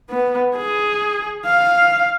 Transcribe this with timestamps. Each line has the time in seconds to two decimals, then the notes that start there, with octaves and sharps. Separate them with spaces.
0.10 B3
0.57 G#4
1.46 F5